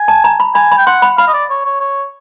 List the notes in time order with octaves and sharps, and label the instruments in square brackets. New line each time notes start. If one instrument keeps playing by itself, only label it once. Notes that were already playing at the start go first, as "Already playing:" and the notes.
Already playing: [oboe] G#5
[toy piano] A5
A#5
B5
[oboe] G#5 [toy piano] B5
[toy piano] B5
[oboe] G5
[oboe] F#5 [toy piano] C6
[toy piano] B5
[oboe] F5 [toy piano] B5
[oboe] D#5
D5
C#5
C#5
C#5